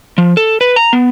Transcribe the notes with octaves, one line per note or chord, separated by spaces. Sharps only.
F3
A4
B4
A#5
B3